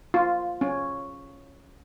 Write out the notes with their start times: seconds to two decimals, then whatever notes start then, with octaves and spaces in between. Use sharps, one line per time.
0.14 F4
0.61 C#4